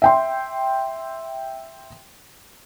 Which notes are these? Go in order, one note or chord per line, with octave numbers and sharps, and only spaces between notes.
E5 G5 C6